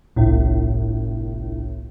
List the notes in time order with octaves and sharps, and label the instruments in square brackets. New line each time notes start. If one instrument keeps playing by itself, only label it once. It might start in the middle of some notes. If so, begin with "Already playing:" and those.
[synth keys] G1 C2 A2